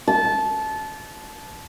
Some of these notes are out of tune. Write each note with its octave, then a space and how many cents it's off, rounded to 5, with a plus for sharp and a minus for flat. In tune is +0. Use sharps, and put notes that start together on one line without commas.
A5 -20